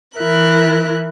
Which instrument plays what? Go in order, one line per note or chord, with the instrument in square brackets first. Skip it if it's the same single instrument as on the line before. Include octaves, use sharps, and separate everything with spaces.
[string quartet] E3 E4 A#4 F#6